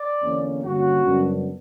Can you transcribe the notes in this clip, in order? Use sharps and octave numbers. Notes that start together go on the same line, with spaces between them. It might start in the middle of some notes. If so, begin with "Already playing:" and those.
Already playing: D5
E2 D3 A#3 C#4
G2 D3 A#3 C#4 F#4
F#2 C#3 G3 B3 D4